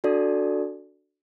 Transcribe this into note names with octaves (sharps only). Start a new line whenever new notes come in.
D4 F#4 A4 D5